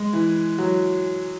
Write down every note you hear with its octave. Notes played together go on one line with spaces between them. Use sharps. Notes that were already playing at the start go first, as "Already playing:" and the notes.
Already playing: G#3
E3
F#3